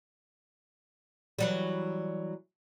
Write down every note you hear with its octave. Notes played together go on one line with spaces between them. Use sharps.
E3 F#3 G3